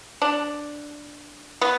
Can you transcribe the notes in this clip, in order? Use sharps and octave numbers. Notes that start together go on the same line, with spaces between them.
D4
B3